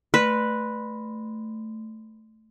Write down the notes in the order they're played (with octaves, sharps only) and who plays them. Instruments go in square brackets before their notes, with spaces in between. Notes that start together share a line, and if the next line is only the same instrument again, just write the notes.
[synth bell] A3 [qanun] B4